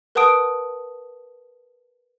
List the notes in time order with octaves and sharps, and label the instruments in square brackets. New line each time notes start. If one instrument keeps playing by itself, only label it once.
[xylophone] A#4 B4 F#5 A5 D#6 D7